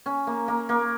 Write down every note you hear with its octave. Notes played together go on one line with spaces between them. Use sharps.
C#4
A#3
A#3
A#3